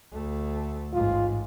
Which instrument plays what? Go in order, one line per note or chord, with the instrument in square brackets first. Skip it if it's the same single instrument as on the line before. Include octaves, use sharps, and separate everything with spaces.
[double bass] D2 A3
[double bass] A1 G#2 [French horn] F4